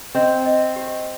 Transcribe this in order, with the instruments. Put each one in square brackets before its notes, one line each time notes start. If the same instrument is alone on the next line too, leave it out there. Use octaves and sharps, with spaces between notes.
[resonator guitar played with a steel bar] C4 [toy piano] D#5
[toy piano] D#5
G4